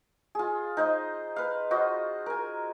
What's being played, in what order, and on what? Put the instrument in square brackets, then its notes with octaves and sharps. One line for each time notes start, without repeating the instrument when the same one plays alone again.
[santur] F4 G#4
D#4 C5 D#5
B4 F5
F4 F#4 C5 D#5
A#4 G#5